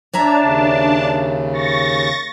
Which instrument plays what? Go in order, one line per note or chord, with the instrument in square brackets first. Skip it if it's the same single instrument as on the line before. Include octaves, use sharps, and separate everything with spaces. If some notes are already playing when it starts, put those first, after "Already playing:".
[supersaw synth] D4 A5 [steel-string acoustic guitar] C#5 E5 A#5
[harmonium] D#2 C#3
[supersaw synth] C#6 A6 A#6